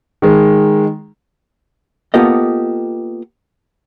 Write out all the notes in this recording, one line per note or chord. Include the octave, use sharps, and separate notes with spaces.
D#3 G#3
A#3 B3 F4 G4 A4 D#5